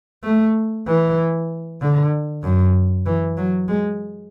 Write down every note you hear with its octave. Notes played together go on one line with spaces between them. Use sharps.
A3
E3
D3
F#2
E3
F#3
G#3